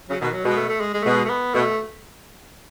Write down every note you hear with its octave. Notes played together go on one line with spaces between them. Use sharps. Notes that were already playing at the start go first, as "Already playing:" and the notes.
C#3 F#3
B2 D#3
F#3
B2 G#3
A3
A3
G#3
G#3
A3
B2 G#3
A3
B3
B2 A3